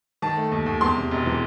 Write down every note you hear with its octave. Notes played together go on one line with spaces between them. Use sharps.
D#3 A5
A3
D#2
D#2
E2 C6
C3
E1
E3